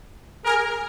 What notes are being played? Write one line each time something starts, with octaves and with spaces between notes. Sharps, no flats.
G#4 A#4